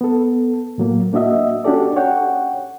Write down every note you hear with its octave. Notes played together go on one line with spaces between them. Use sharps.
B3 A4
A2 F#3 A#3
A#3 D4 F#4 D#5 E5
C#4 D4 F#4 G4 A4 D5
C#5 F#5 G5